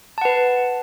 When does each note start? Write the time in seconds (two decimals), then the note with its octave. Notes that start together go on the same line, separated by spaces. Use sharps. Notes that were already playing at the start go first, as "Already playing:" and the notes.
0.18 A5
0.21 F#5
0.25 B4